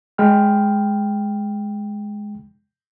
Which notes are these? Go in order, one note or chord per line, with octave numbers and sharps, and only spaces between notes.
G#3 G5 F6